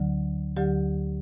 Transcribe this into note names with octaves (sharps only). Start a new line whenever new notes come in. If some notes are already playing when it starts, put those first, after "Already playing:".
Already playing: D2 D3 F#3
D2 D3 F#3 G4